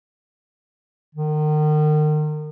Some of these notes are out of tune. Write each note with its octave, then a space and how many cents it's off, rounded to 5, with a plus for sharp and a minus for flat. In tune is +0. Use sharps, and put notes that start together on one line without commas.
D#3 -35